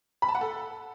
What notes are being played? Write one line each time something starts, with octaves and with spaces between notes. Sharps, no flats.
B5
A5
F#5
A4